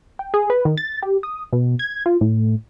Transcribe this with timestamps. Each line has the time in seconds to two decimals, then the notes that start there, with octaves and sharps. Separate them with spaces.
0.19 G5
0.34 G#4
0.50 B4
0.65 D#3
0.77 A6
1.02 G4
1.23 D#6
1.53 B2
1.79 G#6
2.06 F4
2.21 A2